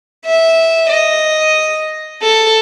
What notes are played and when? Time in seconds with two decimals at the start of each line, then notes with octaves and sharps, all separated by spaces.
0.25 E5
0.90 D#5
2.22 A4